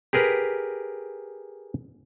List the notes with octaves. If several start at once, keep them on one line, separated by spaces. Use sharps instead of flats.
G4 G#4 A#4 B4